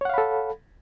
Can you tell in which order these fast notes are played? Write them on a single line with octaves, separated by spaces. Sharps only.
C#5 F#5 F5 B5 A4